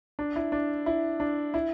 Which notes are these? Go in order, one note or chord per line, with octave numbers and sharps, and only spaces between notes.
D4
E4
D4
E4
D4
E4